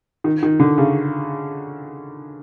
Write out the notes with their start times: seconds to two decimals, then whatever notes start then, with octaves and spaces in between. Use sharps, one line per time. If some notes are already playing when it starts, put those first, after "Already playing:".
0.24 D#3
0.43 D#3
0.60 D3
0.78 C#3